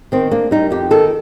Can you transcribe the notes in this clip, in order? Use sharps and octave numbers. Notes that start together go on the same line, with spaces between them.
D#3 C4
A#3 D4
G3 D#4
F2 G4
D#3 A4